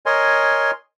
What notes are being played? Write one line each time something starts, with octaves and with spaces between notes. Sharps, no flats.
A#4 C#5 D#5 G#5 C6